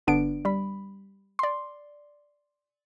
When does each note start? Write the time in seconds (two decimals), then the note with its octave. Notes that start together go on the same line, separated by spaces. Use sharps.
0.07 G1 D3 B3 D4 D7
0.45 G3 B5
1.39 D5 C6